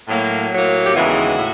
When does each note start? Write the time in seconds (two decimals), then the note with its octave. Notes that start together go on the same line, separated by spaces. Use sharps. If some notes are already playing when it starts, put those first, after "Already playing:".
0.07 A2 F#3 A#3
0.51 A2 F#3 A#3
0.86 G4
0.94 D#2 C#3 E3 G#3 B3 F#4
1.38 A2